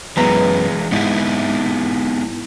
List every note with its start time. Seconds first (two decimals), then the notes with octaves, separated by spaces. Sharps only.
0.17 F#2 E3 G#3 B3 A#5
0.92 G#2 B3 D#4 E4